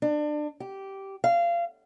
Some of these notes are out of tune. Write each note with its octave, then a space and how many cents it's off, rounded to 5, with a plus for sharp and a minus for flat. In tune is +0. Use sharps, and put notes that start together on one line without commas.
D4 +25
G4 -10
F5 -25